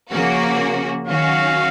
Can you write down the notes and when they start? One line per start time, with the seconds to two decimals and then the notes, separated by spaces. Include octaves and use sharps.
0.11 C#3 F3 A#3 C#4 F#4
1.07 D#3 F#3 C#4 F#4 F5